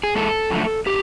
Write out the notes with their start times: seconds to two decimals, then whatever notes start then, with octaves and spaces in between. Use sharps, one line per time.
0.03 G#4
0.15 G#2 E3 G#3 A4
0.50 F#2 D3 F3 A3
0.86 D3 G4